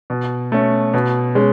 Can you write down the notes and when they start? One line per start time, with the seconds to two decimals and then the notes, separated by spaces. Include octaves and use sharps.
0.10 B2
0.52 A3 C#4
0.94 B2
1.35 G#3 C#4